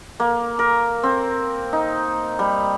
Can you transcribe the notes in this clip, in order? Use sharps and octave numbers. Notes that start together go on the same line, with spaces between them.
A#3
A#4
C4
D#4
G3